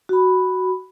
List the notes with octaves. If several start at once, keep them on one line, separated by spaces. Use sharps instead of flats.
F#4 B5